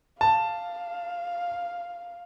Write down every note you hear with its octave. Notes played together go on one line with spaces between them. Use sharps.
F5 A5